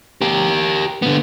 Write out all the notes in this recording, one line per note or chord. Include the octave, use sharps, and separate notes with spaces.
G4 A#4
D3 B3